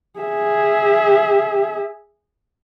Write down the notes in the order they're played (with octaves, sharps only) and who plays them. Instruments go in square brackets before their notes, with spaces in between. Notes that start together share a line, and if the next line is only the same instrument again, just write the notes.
[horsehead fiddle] G#4 E5